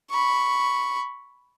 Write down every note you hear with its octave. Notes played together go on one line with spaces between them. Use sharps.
B5 C#6